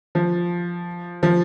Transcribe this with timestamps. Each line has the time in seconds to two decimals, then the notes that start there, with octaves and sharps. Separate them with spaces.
0.15 F3
1.23 F3